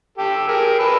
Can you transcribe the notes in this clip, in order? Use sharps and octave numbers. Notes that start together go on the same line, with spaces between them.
G4 A4
G#4 A#4
A4 B4